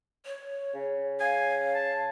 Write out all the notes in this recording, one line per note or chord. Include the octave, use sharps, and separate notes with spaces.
C#5
C#3
F5 G#5
A5